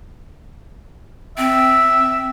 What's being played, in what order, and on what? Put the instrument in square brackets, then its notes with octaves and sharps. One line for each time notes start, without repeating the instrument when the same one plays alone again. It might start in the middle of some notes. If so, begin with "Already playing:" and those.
[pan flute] C4 [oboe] E5